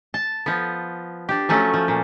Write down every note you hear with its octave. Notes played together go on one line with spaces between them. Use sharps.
A5
F3 B3
D4 G4
F3 F#3 A3 C#4
F3
A#2